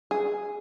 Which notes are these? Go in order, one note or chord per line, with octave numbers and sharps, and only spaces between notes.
G#4